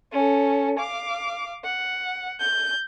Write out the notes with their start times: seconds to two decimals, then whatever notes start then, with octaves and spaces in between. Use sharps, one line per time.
0.12 C#4 A4
0.79 F5 D6
1.64 F#5
2.40 G6